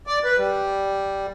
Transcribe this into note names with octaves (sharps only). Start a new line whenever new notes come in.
D5
B4
G3